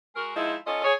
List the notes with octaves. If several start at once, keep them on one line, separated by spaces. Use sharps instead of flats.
G#3 F#4 A#4
F3 G#3 D#4 E4
C#4 F4 A4 C#5 D#5
G#4 C#5